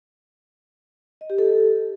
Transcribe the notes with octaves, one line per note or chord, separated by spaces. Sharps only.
D#5
G4
A4